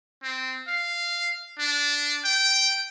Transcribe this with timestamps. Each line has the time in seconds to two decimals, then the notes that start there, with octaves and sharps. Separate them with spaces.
0.23 C4
0.68 F5
1.59 D4
2.24 G5